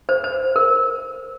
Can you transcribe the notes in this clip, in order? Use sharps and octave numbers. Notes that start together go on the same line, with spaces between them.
C5
C5
A#4